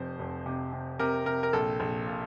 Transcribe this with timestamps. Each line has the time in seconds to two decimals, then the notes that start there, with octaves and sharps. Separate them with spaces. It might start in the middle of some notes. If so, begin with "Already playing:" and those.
Already playing: F1 F2 C3 C5
0.19 F1
0.46 C3
0.73 C3
0.99 C3 A#4
1.26 C3 A#4
1.43 A#4
1.53 A#1 A4
1.80 A#1
2.07 A#2